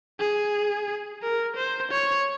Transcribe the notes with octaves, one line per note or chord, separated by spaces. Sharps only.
G#4
A#4
C5
C#5